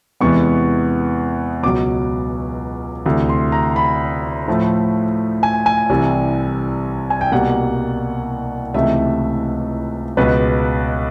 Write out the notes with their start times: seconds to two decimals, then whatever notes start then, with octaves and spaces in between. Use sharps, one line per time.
0.21 E2 C3 E3 G#3 B3 C#6
1.63 C#2 B2 F#3 D6
3.05 D2 C3 E3
3.29 C6
3.52 A#5
3.76 B5
4.48 A2 F3 A3
5.43 G#5
5.66 G#5
5.89 C2 C3 E3 G3
7.10 G#5
7.21 G5
7.32 C2 B2 G3 A#3 F#5
8.74 C#2 C3 E3 A3 E5
10.17 C#2 B2 G#3 B4